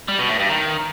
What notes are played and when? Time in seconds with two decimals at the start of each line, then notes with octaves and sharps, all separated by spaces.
0.08 G3
0.19 B2
0.29 A2
0.39 G2
0.49 D#3